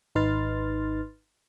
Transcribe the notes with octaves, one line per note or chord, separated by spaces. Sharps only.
G#1 D#4 B4 C6 F6 A6